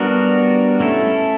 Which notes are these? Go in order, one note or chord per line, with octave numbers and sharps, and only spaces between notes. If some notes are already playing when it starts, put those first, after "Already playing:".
Already playing: G3 B3 D4 F#4 A#4
A3 C#4 E4 A4